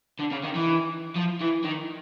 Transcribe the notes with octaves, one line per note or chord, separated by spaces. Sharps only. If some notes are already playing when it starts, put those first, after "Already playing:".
D3
C#3
D#3
E3
F3
E3
D#3